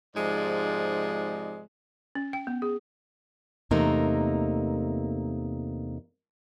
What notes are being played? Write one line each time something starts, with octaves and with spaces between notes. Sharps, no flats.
G#2 C3 F3 G#3 D#4 D5
C#4
G5
B3
G#4
E2 C3 A3 A#3 D#4 A#4